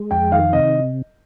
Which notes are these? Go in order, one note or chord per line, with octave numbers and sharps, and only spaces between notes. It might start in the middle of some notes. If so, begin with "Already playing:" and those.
Already playing: G#3
F2 G5
D#3 F5
C3 D#5